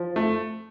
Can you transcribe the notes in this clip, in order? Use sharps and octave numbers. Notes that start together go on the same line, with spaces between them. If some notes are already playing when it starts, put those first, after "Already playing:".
Already playing: F3
A3